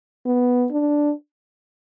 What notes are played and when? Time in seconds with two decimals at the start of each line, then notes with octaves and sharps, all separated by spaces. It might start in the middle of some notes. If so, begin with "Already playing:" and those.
0.26 B3
0.71 D4